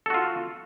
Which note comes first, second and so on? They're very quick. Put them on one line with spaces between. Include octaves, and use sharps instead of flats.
A4 F#4 F4